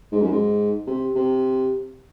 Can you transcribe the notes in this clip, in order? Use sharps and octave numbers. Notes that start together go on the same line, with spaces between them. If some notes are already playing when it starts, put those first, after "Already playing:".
G#2
F#2
G#2
C3
C3